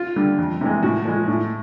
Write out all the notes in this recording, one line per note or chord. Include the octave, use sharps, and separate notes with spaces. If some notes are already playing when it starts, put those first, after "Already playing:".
Already playing: F4
D3 G3
F2
C3 E3 G#3
A2 F#4
F3 G#3
A2